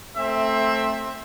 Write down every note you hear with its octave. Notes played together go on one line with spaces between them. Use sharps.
A3 C4 E5